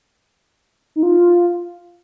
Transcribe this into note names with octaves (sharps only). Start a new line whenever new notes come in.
D#4
F4